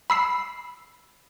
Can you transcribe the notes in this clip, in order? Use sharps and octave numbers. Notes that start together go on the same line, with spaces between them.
B5 E6 C7